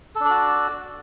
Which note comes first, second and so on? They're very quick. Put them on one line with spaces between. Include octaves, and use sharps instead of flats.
A4 D4 D5 F#4